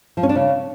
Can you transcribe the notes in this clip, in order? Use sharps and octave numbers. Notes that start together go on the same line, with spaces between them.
F3
C#4
D4
C#3